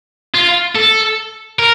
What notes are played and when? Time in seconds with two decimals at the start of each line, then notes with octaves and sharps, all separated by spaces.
0.35 F4
0.76 A4
1.59 A#4